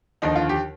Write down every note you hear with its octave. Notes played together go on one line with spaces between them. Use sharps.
D#2 D3 F3 D#4
F4
G4